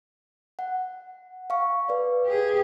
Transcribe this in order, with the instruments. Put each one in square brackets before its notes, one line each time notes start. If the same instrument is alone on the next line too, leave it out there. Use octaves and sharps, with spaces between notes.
[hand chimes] F#5
F5 C#6
B4 D5
[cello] G4 G#4